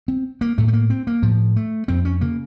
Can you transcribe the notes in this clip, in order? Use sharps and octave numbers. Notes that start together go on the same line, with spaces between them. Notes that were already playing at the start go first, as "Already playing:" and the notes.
C4
A#3
A2 A3
A3
A#3
C4
A#3
A2 F3
A3
F2 C4
C#4
C#3 A#3